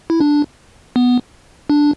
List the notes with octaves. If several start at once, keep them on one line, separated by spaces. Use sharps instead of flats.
E4
D4
B3
D4